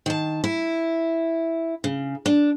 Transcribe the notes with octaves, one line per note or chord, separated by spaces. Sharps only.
D#3 A5
E4
C#3
D4